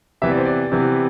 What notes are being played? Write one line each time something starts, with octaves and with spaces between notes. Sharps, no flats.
C3 E3 B3 E5
D5
C5
D5
C3 E3 B3